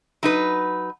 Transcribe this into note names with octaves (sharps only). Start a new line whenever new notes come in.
F#3 D#4 B4